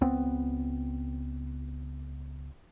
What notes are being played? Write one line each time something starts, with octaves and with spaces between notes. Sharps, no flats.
C#2 B3 C4